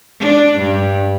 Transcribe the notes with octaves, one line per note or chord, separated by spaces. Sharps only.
D4
G2